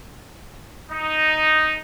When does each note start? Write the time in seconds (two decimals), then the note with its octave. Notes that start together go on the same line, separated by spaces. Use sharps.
0.92 D#4